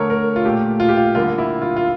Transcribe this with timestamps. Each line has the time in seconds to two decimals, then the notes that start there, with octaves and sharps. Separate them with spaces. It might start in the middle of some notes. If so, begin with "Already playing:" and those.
Already playing: D3 A3 A#4 C#5
0.10 A#4
0.36 F4
0.45 A#2 A3 G4
0.80 F4
0.89 G4
0.97 F4
1.15 D3 G3 A#3 F4
1.38 E4
1.62 F4
1.77 F4